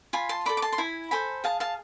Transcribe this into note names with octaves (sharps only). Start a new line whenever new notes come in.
F4 G#5 B5
A5 C6
A4 D5 B5 D6
D6
A5 C6
C6
E4 G#5 B5
A4 C5 G#5 B5
G#4 F5 A5
F5 A5